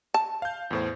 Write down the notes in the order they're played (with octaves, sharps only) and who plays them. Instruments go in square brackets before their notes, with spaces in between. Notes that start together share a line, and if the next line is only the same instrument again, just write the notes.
[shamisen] A5
[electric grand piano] F5 G6
E2 A2 C5